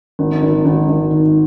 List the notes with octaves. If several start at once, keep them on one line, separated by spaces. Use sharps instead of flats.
G#1
G#1
G#1
G#1
D#3